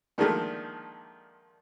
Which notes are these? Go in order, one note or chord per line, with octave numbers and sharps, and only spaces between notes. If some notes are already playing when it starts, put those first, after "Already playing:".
A#2 D3 D#3 F3 G#3 A3